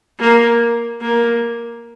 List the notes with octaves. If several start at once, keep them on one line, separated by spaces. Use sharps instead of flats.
A#3
A#3